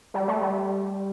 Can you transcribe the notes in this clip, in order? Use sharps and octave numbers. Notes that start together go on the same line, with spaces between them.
G3
A3
G3